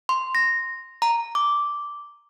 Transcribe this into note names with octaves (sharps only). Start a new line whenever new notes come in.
C6
A#6
A#5
D6